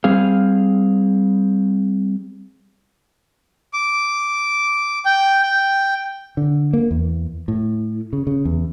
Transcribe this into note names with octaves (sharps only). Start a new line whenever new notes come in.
G3 C4 G#4 F5
D6
G5
G5
D3
A#3
E2
A2
C#3
C#3
E2